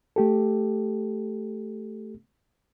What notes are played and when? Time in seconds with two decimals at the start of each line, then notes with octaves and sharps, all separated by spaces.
0.16 A3 G4 A4